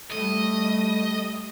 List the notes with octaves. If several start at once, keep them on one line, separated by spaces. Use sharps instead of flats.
G3 A3 D#5